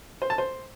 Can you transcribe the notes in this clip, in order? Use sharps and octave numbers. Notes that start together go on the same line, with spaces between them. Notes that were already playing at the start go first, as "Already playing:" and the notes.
C5
A5
C5